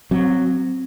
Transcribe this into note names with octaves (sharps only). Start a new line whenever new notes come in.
F#3 C4
C4